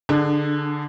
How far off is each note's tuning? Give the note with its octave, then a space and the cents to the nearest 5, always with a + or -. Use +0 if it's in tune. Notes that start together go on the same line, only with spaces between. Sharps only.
D3 +0 D4 +30 G#4 +0